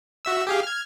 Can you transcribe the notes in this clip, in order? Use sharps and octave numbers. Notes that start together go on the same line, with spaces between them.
F#4 E5 E6
G4 G#4 F5
F6 G#6